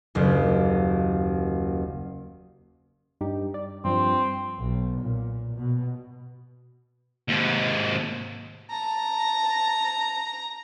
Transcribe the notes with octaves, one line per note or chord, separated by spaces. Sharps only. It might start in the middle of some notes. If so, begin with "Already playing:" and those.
F#1 D#2
G2 D#4 G4
D5
G2 F3 C4
B1
A#2
B2
D#2 G#2
A5 A#5